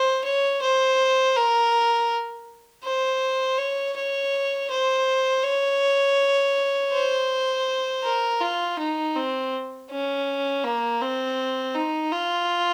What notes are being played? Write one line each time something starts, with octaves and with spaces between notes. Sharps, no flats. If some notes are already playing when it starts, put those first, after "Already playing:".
Already playing: C5
C#5
C5
A#4
C5
C#5
C#5
C5
C#5
C5
A#4
F4
D#4
C4
C#4
A#3
C4
D#4
F4